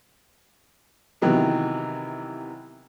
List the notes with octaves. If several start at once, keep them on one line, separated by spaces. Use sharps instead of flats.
C3 D#3 E3 F#3 B3